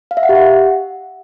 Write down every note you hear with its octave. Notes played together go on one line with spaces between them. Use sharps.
F5
E5
F#5
G4
F#5